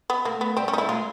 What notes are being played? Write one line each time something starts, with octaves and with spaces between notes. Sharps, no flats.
B3
A3 A#3
B3
G3 C4
C#4
G3 D#4 E4
A3
G#3 F4